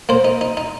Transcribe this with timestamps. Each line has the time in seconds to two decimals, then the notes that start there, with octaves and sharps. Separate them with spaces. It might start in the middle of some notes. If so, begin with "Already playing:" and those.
0.09 A#3 C5
0.24 D#4
0.41 D#4
0.57 D#4